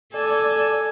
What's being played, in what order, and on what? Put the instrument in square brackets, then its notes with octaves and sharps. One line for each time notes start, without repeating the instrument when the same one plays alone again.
[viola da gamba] A4 [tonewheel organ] D5 [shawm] G#5